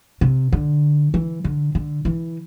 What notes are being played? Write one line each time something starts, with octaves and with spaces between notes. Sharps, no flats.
C3
D3
E3
D3
D3
E3